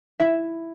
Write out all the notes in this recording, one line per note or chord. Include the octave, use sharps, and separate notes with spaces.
E4 E5